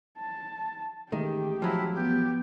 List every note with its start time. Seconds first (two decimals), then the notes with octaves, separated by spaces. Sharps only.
0.19 A5
1.12 A1 D#3 G#3 A3 G4
1.62 F3 F#3 E4
1.94 B3 G4